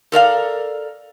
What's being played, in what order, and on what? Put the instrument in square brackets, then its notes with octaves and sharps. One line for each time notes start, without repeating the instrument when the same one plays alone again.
[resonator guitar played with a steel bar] A4 A#4 D5 F5